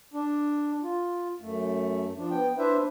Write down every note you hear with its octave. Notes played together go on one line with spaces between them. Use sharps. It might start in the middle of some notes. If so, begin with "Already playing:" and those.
D4
F4
F#2 A3
F3 D4
B3 G5
D4 E4 B4 C5 E5